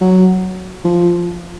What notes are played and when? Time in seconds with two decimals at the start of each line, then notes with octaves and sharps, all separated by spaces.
0.01 F#3
0.85 F3